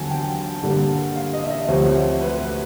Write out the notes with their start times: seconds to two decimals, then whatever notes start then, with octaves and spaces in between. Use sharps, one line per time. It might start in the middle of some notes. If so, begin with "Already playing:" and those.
Already playing: D#2 D3 F#3 B3 G#5 A5
0.10 G5
0.63 G2 D3 G3 A#3
1.16 F5
1.33 D#5
1.45 E5
1.51 D#5
1.68 D2 C3 F3 C#5
2.21 B4
2.39 B4